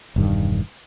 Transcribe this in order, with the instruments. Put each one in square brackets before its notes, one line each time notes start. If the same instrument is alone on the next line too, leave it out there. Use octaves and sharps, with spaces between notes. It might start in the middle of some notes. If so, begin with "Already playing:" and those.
[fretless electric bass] E1 G2 D#3